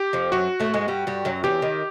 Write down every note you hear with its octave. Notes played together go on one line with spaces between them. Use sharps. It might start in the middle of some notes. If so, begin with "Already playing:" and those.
Already playing: G4
F2 F3
F#2 F#3 F#4
A2 A3
G#2 G#3
G2 G3
G2 G3
F#2 F#3
E2 E3 G4
D#3